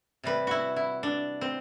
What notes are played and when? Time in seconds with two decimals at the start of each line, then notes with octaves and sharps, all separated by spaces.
0.24 C3 G3 B4
0.47 E4 F#4
0.76 E4
1.03 D4
1.41 C4